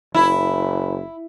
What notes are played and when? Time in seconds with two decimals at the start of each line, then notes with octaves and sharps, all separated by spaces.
0.15 F#1 E4 B5